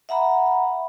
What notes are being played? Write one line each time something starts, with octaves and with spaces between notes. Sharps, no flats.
E5 F#5 A#5 B5